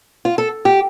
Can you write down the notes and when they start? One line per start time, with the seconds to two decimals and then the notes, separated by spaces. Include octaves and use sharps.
0.25 F4
0.38 A4
0.65 G4